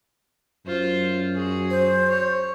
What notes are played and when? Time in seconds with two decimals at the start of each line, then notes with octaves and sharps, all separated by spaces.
0.66 F#2 F4 C5
1.35 F#4 G#4
1.71 C5
2.09 C#5